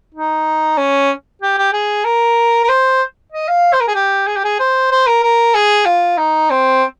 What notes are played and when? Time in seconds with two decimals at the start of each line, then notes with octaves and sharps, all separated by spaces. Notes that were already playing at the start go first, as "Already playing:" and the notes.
0.14 D#4
0.77 C#4
1.42 G4
1.58 G4
1.73 G#4
2.04 A#4
2.64 A#4
2.69 C5
3.32 D#5
3.48 F5
3.73 C5
3.80 A#4
3.88 G#4
3.95 G4
4.27 G#4
4.37 G4
4.44 G#4
4.60 C5
4.91 C5
5.07 A#4
5.23 A#4
5.54 G#4
5.85 F4
6.18 D#4
6.50 C4